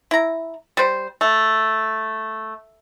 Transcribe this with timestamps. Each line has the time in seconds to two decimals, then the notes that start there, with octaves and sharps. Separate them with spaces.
0.11 E4 A#5
0.77 G3 C5
1.21 A3